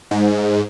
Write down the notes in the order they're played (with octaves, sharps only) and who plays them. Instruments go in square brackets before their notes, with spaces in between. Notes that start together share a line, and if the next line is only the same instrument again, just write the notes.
[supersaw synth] G#2